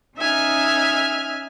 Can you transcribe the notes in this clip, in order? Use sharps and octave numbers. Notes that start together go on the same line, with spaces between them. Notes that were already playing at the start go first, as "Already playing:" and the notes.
C#4 D#4 E5 G#5 F6